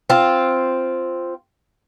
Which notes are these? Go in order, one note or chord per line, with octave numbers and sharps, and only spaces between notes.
C4 F4